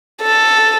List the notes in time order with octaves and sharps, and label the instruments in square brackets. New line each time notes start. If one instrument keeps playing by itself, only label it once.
[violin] A4